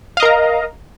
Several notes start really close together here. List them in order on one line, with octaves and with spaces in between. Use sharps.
F5 D#5 A#4 A#5